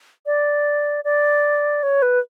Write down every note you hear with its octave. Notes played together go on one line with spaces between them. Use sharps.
D5
D5
C#5
B4